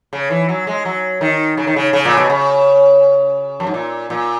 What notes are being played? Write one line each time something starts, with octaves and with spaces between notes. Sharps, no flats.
C#3
E3
F#3
G#3
F#3
D#3
C#3
D#3
C#3
C#3
A#2
B2
C#3
F#2
G#2
A#2
A#2